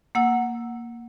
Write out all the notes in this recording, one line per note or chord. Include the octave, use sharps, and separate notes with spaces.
A#3 F#5 E6